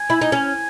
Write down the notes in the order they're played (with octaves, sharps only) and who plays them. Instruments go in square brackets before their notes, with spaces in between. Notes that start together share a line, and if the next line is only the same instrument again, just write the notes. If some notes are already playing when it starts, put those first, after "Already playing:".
Already playing: [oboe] G#5
[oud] E4
D#4
C#4